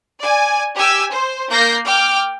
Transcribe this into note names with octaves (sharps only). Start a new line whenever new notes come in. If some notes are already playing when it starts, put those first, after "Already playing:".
D5 G#5
G4 G#5 E6
C5
A#3 G6 A#6 C7
G5 D6 F6